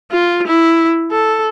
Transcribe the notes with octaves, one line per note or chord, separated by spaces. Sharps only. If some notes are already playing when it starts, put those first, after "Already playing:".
F4
E4
A4